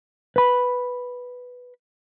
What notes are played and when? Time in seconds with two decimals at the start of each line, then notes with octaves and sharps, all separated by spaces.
0.36 B4 B5